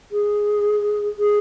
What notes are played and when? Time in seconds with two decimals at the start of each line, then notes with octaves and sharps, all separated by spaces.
0.12 G#4
1.19 G#4